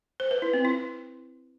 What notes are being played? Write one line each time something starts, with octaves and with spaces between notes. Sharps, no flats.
C5
B4
E4
C4
E4